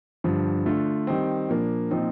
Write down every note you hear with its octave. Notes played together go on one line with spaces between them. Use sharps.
G2 D3 F3
D3 A3 D4 F4
D#3 G3 C4
A#2 F3 A#3 D4
A#2 F3 C4 D#4